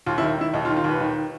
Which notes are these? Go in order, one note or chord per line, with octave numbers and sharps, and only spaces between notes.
D#2 F4
E4
D#3
D#3 E4
D#2 D#4
F4
D#3
F4
D#2 B4
D#3